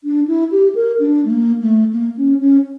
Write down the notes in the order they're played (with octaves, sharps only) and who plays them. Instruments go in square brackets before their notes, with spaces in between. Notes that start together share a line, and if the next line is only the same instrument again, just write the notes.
[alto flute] D4
E4
G4
A#4
D4
A3
A#3
A3
A#3
C#4
C#4